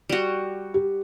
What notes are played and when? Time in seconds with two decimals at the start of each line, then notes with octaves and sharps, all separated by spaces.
0.09 G3 F#4
0.74 G4